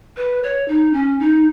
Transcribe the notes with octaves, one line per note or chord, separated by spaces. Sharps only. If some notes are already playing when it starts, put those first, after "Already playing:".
B4
C#5
D#4
C#4
D#4